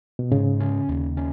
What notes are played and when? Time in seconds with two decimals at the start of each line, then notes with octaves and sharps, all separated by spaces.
0.19 B2
0.31 G#2 C#3
0.60 C#4
0.89 D#2
1.17 C#4